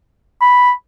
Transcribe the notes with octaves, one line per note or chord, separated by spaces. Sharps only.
B5